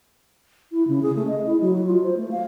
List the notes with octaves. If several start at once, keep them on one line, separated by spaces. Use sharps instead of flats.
E4
C#3
G#4
A3
D#5
E4
F#3
F4
C5
A3
F5